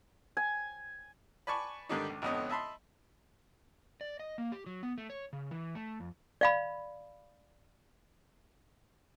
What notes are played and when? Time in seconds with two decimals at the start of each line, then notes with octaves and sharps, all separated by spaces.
0.37 G#5
1.47 B4 D5 G#5 A5 C#6
1.89 G#2 D3 D#3 G3 D4 D#4
2.10 C#2
2.22 G#1 F2 D3 B3 C#4 D#5
2.50 D#5 E5 A5 B5 C6
4.01 D5
4.19 D#5
4.38 A#3
4.52 G4
4.66 F#3
4.83 B3
4.98 A3
5.10 C#5
5.33 C#3
5.51 E3
5.75 A3
6.00 F2
6.41 D5 F5 B5